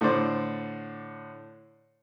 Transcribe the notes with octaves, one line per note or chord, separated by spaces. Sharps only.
A2 D3 C5 D5